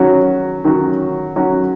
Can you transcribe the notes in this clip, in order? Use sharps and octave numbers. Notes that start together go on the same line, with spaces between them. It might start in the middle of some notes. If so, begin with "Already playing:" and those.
Already playing: D#3 F#3 C#4 F#4
D#3 F#3 C#4 F#4
D#3 F#3 C#4 F#4